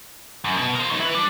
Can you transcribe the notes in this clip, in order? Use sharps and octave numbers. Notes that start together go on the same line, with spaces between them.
F#2
B2
A#4 C5
F#3 D#4
E4 B4
G3 D4